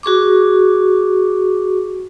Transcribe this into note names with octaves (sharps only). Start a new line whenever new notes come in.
F#4 G#4 C#6 D6